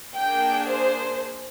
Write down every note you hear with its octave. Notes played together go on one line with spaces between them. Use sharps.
A#3 D4 G#4 G5
C5